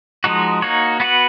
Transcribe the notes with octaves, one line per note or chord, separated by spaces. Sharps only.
F3 G#3 D#4 F#4
A#3 D#4 F#4 C#5
B3 F#4 B4